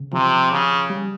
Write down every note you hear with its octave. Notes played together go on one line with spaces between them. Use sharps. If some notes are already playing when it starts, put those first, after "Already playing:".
Already playing: C#3
C3 F3
C#3
G3